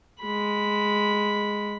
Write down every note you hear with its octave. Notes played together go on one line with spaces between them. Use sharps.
G#3 B5